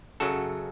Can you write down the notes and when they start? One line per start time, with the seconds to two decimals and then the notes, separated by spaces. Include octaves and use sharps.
0.20 F#2 C#3 F#3 F#4 A4